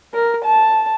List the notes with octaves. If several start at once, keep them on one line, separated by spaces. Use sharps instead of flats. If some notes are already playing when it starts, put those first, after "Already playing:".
A#4
A5